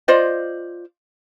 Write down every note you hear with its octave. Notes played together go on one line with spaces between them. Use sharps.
F4 C5 D5 D#5